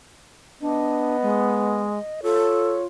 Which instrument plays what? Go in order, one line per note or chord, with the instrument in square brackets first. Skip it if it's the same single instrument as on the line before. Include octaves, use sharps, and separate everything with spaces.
[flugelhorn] B3 [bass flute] D4 [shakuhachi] D#5
[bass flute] G#3
[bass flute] F4 [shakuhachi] A4 [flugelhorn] C#5